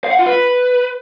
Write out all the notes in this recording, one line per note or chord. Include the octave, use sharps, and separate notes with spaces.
F5
F#5
F4
B4